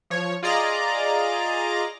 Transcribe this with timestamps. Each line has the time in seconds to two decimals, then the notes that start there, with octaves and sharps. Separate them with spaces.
0.10 F3 C#5
0.43 F4 G#4 D5 D#5 A#5 D6